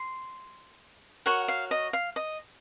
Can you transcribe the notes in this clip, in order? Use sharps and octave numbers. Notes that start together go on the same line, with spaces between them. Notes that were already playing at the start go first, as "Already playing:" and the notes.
Already playing: C6
F#4 A#4 C#5 F#5
F5
D#5
F5
D#5